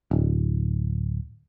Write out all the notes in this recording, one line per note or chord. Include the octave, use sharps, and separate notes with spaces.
D1